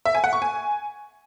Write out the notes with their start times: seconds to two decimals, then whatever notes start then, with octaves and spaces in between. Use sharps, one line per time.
0.06 E5
0.15 G#5
0.24 F#5
0.33 C#6
0.42 G#5